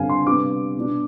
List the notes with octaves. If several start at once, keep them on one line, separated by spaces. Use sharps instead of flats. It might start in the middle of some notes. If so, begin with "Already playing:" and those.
Already playing: G2 D3 G3 C4 F5 G#5
C6
C3 G3 B3 D4 D6
B2 B3 D4